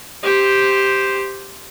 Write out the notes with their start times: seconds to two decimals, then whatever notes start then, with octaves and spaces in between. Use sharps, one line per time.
0.23 G4 C5